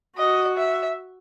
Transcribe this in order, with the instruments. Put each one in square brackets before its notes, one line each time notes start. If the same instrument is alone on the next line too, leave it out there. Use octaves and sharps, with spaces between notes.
[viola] F#4 [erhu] D#5
[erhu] E5